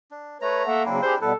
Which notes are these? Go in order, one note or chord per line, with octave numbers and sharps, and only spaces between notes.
D4
A3 B4 C#5 A#5
A#3 A4 E5 F#5
C#3 F#3 C4 D4 E4
G4 G#4 C5
B2 G3 B3 E4 A4 B4